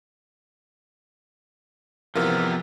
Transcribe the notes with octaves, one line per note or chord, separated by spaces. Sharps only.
C3 E3 F3 B3 F4 A#4